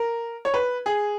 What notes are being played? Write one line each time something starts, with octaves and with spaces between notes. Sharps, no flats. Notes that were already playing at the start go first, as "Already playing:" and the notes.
Already playing: A#4
C#5
B4
G#4